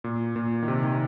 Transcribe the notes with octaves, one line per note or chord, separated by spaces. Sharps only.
A#2
A#2
D#3
C3
D#3